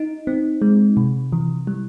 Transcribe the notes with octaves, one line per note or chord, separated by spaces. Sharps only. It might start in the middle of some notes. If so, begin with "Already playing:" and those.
Already playing: D#4
C4
G#3
C3
E3
G3